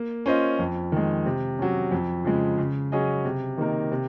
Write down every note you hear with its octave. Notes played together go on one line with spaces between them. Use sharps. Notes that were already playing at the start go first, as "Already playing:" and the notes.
Already playing: A#3
C#4 F4 C5 D#5
F2
D#3 G#3
C3
F#3 C#4
F2
C#3 F3 G#3
C#3
F#3 C#4 G#4 D#5
C3
D#3 A#3 D#4 A#4
C3